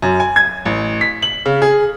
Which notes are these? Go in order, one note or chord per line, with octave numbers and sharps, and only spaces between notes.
F#2
G#5
G#6
A1
B6
F#7
C#3
G#4